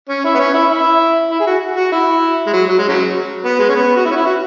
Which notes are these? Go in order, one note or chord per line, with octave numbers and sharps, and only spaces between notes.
C#4
E4
B3
C#4
E4
E4
E4
G#4
F#4
F#4
E4
G#3
F#3
F#3
G#3
C#3 F#3
B3
G#3
C#4
B3
F#4
E4
C#4
E4
F#4